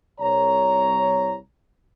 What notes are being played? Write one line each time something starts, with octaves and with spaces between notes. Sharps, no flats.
C2 C#5 A#5